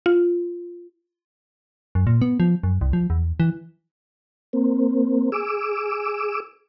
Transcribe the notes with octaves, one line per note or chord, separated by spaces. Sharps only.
F4
F#2
A#2
B3
F3
F#2
C2
F3
E2
E3
A#3 C4
G#4 D6 E6